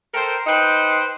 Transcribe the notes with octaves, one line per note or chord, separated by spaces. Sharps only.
A4 A#4 C5 G5
D#4 B4 C5 G5